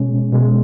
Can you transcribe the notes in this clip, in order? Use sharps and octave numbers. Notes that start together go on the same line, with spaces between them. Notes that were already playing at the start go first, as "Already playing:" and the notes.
Already playing: B2 G#3 C#4
B2 G#3